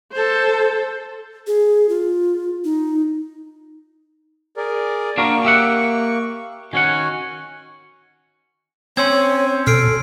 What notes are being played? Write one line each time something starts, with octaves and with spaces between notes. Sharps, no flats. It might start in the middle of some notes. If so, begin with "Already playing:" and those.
A4 C5
G#4
F4
D#4
G#4 A#4 D5
A#3 D4 F#4 A#4 C#6
G4 E5 F#5
D#3 C#4 F#4 F#5 G#5
C4 C#4 C#5 C6 E6 G#6
B2 A4 F6 C7 D7